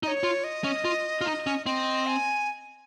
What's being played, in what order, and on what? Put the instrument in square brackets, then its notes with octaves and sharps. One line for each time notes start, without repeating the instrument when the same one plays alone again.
[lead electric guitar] D#4 [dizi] D#5
[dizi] C#5
[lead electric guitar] F4
[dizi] D#5
[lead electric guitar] C#4
F4
F4
D#4
C#4
[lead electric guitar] C4 [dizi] D#5
[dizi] G#5